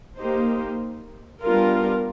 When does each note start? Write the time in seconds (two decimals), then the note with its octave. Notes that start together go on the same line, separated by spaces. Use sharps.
0.18 A#3 D#4 G4 C5
1.43 G3 B3 D4 F4 A#4